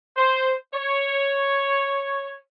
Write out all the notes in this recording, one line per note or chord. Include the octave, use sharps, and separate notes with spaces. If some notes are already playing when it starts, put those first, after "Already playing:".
C5
C#5